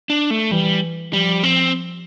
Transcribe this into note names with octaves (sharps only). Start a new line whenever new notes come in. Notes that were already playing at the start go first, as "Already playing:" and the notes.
D4
A3
E3 G3
F3 G3
C4